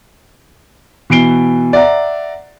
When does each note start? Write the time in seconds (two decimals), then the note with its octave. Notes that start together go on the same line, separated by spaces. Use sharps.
1.10 B2 E3 C7 D7 G7
1.73 D5 E5 F#5 A#5